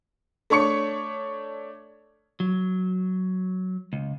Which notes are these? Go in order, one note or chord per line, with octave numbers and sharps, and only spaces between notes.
A3 D4 C#5 C#6 C#7
F#3
C#2